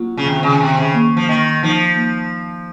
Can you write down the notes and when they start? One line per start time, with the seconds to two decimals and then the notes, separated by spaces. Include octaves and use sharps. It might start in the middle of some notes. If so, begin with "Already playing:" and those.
Already playing: F#3 A#3 F4
0.17 C#3
0.26 C3 D#3
0.43 C#3
0.60 C3 D#3
0.78 C#3
0.94 A#3
1.17 F3
1.29 D#3 A#3
1.63 F3 D#4
1.96 A#3